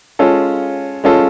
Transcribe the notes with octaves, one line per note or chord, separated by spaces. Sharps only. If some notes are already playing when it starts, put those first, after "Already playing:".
G#3 C#4 F4 A4
G#3 C#4 F4 A4